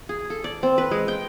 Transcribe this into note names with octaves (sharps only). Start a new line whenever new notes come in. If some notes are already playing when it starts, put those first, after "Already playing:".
G#4
A4
D5
C4
B4
G#3
G5